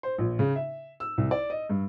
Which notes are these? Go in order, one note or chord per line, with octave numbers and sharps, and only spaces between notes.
C5
A#1
C#3
E5
E6
C2
D5
D#5
G2